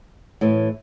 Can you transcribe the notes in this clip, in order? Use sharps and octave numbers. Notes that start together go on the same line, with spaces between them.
A2 E3 A3